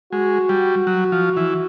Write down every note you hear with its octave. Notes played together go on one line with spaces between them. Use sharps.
G#3 F#4
G3
F#3
F3
E3